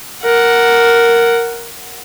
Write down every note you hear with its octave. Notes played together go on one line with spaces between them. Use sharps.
A#4 F#5